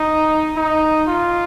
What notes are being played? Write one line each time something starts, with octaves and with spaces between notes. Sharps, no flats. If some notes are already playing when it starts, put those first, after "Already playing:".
Already playing: D#4
D#4
F4